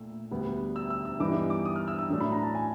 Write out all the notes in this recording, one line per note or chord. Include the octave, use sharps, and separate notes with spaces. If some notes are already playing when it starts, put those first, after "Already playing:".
Already playing: A#2 A3 E6
D2 D3 G3 B3
E6
E6
E6
G2 E3 G3 B3 D#4 D6
D6
D#6
F6
E6
E6
A2 F#3 A3 D4
B5
A#5
A5
G#5